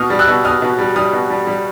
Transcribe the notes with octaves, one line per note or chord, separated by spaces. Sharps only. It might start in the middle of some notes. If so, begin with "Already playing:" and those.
Already playing: B2 D#6 F6
G3
E6 F#6
B2
B2 D#6 F6
B2
G3
G3 D#6 F6
B2
G3
G3